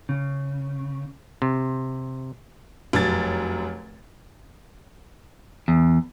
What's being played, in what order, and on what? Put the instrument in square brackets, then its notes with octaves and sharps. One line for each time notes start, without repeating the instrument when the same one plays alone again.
[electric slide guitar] C#3
[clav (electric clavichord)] C3
[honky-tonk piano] F1 F#2 G#6 A6
[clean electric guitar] E2